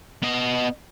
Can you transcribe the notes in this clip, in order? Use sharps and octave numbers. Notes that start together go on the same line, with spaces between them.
B3 D#5